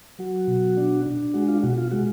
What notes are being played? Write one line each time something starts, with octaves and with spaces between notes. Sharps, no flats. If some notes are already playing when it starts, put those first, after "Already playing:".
F#3 F#4
B2
D4
D4
G#3 F#4
F4
B2 F#4
F4
G#3 F#4